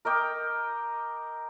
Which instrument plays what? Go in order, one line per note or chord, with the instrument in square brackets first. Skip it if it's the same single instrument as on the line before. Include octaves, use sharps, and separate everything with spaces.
[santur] A#4 D#5 G5 D6